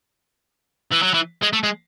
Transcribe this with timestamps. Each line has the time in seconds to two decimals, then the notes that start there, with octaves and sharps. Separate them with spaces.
0.91 E3
1.02 F#3
1.14 E3
1.43 G#3
1.53 A3
1.63 G#3